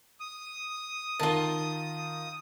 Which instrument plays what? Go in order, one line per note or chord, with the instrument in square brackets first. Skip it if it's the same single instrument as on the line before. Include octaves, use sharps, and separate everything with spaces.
[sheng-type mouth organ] D#6
[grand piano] D#3 A#4 [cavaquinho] F4 A5